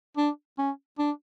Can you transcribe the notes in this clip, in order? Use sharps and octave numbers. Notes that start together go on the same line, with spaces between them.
D4
C#4
D4